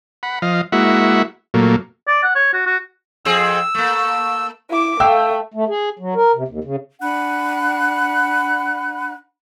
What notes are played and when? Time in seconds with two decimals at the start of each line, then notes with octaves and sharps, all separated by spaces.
0.23 F#5 B5
0.42 F3 D#5 F5
0.72 G#3 A#3 E4 F#4 E5 F#5
1.54 A#2 F#3 A3 A#3
2.08 D5
2.24 F#5
2.35 C#5
2.53 F#4
2.66 F#4
3.25 F2 C4 G#4 E6
3.75 A3 A#3
4.70 E4 D6
5.00 A3 F5 G5 E6
5.54 A3
5.69 G#4
5.99 F#3
6.15 A#4
6.35 C3
6.48 D#2
6.64 C#3
7.01 D4 F#5 B5 F#6